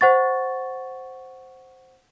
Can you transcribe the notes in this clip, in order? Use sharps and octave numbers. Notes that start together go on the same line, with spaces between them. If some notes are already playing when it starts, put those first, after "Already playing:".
C5 F#5 C#6 A6